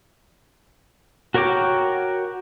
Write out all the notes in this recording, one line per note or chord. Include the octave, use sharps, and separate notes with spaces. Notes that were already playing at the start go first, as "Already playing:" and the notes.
F#4 A#4 C#5 G5 D6